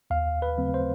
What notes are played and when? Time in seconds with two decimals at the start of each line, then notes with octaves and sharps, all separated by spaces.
0.10 D#2 F5
0.42 B4
0.58 C#3 F#3 A3 C4
0.74 C5